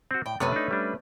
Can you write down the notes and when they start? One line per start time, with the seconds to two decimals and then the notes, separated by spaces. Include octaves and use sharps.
0.11 C4 F#4
0.26 A2 G5
0.40 F#2 C3 A3 B3 C#4 B4
0.52 D4 D#4
0.71 G3 D4